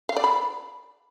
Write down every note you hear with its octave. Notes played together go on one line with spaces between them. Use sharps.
F5
D5
B5